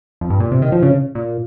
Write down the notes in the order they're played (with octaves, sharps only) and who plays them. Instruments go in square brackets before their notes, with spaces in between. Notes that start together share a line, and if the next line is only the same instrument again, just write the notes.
[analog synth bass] F2
G2
A#2
C3
D#3
F3
C#3
A#2